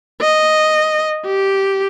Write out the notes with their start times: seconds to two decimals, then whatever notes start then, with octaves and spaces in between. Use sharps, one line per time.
0.21 D#5
1.25 G4